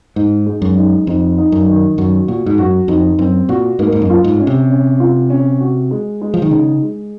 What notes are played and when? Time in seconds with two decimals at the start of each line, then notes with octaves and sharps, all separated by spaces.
0.16 G#2 D#4
0.46 G#3
0.62 F#2
0.76 D#4
1.07 F2 D#4
1.38 D#4
1.52 F#2
1.67 D#3
1.98 F#2 F#4
2.28 A#2 F#4
2.46 G#2
2.58 F#2 F#4
2.88 F2 D#4
3.19 F#2 C4
3.49 A#2 F#4
3.79 G#2 A#3
3.92 G#2
4.02 F#2
4.10 F4
4.24 G#2
4.40 C#4
4.47 C3
4.70 C#4
5.00 F4
5.30 C#4
5.60 F#4
5.91 G#3
6.21 G#3
6.34 F3
6.42 D#3
6.51 C#3 D#4
6.82 G#3